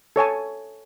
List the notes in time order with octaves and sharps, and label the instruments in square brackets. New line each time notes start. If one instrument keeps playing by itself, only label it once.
[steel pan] A4 C#5 G#5 A5